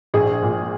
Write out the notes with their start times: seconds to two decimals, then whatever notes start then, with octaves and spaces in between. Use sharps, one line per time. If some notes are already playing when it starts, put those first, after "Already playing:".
0.14 A#1 G#4
0.42 A#2